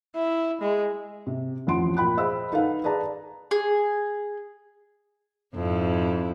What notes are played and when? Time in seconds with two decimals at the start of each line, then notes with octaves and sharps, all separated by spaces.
0.15 E4
0.61 G#3
1.27 C3
1.67 A1 F2 F3 F#5 C6 D7
1.97 A#2 G5 B5 F#6
2.17 G#4 C5 D#5 F5 B5 E6
2.52 D#4 A4 B4 F5 F#5
2.84 G#4 B4 D5 A5 A#5
3.51 G#4
5.55 F2 G#2 E4